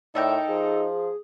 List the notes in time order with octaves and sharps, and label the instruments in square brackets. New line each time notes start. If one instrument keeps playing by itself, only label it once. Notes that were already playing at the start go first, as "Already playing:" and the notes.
[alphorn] A2 [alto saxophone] D#4 [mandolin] A4 A#4 G5 [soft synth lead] D5
[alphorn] F3 [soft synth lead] G#4